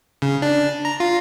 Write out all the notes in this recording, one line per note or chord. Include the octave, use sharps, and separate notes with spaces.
C#3
D4
A#5
F4